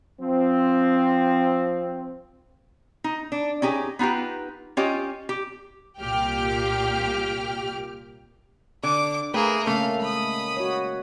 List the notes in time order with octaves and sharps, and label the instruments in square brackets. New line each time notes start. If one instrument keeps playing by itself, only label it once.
[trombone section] F3 C4
[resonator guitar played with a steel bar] D#4
D4
C#4 D#4 G4 G#4
B3 D#4 F4 G4 B4
C#4 F4 G4 C#5 D#5
G4
[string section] C2 A#2 G4 G5 F6
[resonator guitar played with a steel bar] D3 [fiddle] D6
[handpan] A3 [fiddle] A#3 G#4 [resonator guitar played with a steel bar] B4
[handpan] C#3 A#3 C#4 [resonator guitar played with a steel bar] A3 [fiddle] F5
[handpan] G#3 [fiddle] B5 D#6
[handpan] F#4 C#5